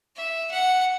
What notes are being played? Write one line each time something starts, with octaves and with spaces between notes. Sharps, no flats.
E5
F#5